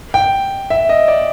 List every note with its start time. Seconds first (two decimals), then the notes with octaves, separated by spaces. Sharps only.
0.14 G5
0.70 E5
0.89 D#5
1.08 D5